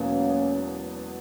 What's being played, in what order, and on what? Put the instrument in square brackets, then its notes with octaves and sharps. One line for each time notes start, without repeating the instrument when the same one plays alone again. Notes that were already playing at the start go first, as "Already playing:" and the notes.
Already playing: [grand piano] E1 E2 B2 F#3 B3 [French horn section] A#3 C#4